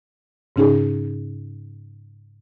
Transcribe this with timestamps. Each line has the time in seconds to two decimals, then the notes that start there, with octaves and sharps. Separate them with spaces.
0.56 G#2 C#3 C#4 D#4 G#4